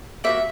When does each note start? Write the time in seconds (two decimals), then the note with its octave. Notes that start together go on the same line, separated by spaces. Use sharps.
0.24 A#3 D#4 F#4 E5